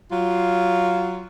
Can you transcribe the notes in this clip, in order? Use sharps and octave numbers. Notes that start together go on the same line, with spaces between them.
F#3 F4